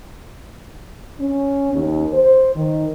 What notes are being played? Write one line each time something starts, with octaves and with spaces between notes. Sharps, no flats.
C#4
D#2
C5
D#3